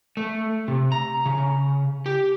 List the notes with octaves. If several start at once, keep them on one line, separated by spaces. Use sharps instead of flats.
A3
C3
A#5
C#3
G4